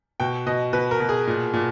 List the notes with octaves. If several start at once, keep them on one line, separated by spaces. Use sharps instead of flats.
B2 G5
B2 D#5
B2 B4
A#4
B2
G#4
A#2
A#2